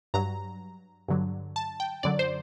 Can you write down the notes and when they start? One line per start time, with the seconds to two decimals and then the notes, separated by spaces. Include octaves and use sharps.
0.14 G2 F#3 A#5
1.08 G2 D3 F#3
1.56 A5
1.80 G5
2.03 F#2 D3 F#3 D5
2.19 C5